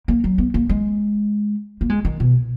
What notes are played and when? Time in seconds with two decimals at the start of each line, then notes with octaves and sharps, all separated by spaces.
0.08 A#3
0.24 F#3
0.38 B3
0.54 A#3
0.69 G#3
1.81 A#3
1.90 G#3
2.05 D#3
2.20 B2